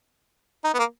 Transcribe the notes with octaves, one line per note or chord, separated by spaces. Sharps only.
D#4
B3
A#3